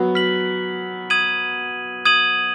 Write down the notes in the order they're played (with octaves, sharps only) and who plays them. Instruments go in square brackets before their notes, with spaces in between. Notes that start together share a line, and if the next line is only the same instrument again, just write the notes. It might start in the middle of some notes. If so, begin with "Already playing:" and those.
Already playing: [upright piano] F#3 B3
[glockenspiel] F6 B6 F#7
D#6 G#6 D#7 F#7
D#6 G#6 D#7 F#7